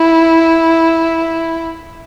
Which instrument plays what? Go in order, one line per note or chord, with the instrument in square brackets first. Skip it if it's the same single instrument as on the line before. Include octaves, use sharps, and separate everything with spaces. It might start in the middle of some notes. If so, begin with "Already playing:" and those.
Already playing: [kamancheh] E4